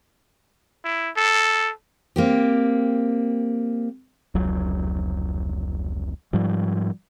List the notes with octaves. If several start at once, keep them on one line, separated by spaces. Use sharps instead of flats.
E4
A4
A#3 C4 G4
F1 C#2 F#3
G#2 F3 G3